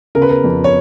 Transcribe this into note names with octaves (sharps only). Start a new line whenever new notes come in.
C#3 A#4
B4
A#4
F2
C#5